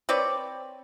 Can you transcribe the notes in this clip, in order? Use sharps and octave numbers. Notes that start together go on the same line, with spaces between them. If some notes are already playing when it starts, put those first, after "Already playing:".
C4 B4 C#5 D5